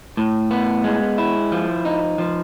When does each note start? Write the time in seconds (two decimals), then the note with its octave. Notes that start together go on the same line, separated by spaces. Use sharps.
0.17 A2
0.51 B3
0.84 G#3
1.18 E4
1.52 F3
1.85 D#4
2.18 F3